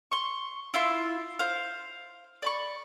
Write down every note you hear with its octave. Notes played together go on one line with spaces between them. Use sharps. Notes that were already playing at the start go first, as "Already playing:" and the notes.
C6 C#6
E4 F4 E5 C6
C5 F5
D5 B5 C#6